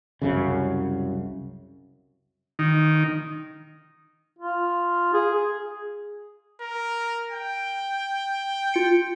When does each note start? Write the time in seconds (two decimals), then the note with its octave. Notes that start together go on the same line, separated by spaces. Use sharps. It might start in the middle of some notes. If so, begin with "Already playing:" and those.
0.22 C2 F#2 C#3
2.59 D#3
4.39 F4
5.14 G#4
5.34 G#4
6.61 A#4
7.31 G5
8.74 F4 C#7